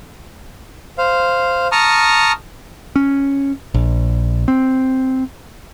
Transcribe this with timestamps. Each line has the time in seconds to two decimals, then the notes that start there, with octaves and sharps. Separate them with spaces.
0.98 C5 F5
1.72 A5 A#5 C#6 D#6 F6
2.96 C#4
3.74 A#1
4.48 C4